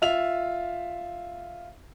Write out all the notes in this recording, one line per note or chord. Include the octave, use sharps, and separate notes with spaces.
F4 E5 F7